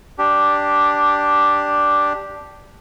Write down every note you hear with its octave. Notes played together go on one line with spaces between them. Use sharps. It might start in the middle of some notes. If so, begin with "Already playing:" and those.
D4 G4